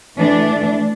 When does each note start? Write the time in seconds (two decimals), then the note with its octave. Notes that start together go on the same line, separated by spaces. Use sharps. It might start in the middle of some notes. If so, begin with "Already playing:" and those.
0.17 E3 A3 D4